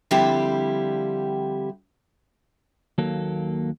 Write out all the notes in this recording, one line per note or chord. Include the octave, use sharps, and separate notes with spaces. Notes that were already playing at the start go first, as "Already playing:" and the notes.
D3 F3 G3 C4 E4 G4
D#2 F#3 A#3 A4